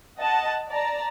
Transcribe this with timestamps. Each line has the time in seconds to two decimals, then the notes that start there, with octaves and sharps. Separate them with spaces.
0.18 D#5 F#5 A5
0.68 D5 A5 A#5